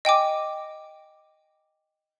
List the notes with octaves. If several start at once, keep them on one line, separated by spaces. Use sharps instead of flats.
D#5 G5 G#5 D6